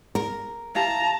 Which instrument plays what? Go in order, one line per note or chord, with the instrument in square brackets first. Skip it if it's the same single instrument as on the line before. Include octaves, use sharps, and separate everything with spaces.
[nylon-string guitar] A#4
[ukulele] E4 G4 F5 [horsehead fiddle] A5 [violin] A#5